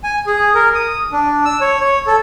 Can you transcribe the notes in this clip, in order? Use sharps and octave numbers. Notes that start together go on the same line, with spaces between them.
G#5
G#4
A#4
D#6
D4
E6
C#5
C#5
A4